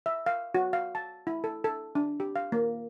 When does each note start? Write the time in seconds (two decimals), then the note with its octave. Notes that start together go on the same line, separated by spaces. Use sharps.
0.06 E5
0.26 F5
0.54 F#4
0.73 F5
0.95 A5
1.27 E4
1.44 A4
1.64 A4
1.95 D4
2.20 G4
2.36 F5
2.52 A#3